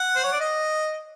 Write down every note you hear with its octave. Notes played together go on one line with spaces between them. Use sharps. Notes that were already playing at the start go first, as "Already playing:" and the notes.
Already playing: F#5
C5
C#5
D5
D#5